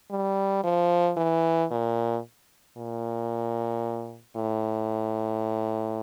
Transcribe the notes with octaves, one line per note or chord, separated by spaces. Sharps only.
G3
F3
E3
A#2
A#2
A2